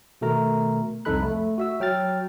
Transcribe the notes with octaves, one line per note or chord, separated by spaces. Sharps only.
B2 D#3 A3 A#4 A#5
C2 F2 D#4 A4 B5 F#6
A3
F#4 E5 E6
F#3 G5 F6 A6